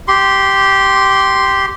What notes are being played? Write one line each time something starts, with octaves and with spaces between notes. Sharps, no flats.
G4 C6